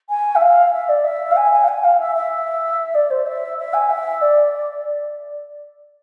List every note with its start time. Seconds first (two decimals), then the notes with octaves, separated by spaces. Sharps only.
0.10 G#5
0.36 E5
0.41 F5
0.73 E5
0.89 D5
1.05 E5
1.31 F5
1.37 G#5
1.52 G#5
1.64 F5
1.68 G#5
1.84 F5
2.00 E5
2.15 E5
2.95 D5
3.11 C5
3.26 E5
3.58 E5
3.74 G#5
3.90 E5
4.22 D5